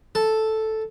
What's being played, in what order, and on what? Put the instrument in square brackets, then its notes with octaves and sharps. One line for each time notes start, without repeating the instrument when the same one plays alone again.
[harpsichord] A4